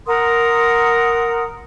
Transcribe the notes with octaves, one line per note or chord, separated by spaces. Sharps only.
A#4 F#5 C6 D#6